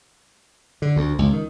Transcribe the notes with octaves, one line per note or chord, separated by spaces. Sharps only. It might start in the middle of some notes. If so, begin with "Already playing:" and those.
D3
D2
C#2
D#3